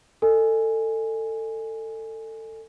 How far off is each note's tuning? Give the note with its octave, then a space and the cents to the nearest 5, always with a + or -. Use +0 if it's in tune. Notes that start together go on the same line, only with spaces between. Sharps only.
A4 +20 D#5 -25 G#5 +0